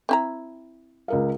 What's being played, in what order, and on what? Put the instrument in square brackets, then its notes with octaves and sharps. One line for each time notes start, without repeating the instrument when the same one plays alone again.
[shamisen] C4 E4 A#5
[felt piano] C#2 A#4 F5